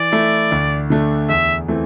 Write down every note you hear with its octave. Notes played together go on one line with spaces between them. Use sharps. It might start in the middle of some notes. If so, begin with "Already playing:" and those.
Already playing: E3 D5
A3 E4
D2
D3 A3 D4
E2 E5
E3 A3 C4